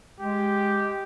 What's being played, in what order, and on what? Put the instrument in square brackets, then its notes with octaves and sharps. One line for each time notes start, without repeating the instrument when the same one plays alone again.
[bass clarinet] G#3 [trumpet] G4